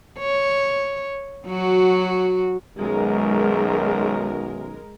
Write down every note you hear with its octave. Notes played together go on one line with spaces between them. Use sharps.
C#5
F#3 F#4
B1 F#2 D#3 G#3 A#4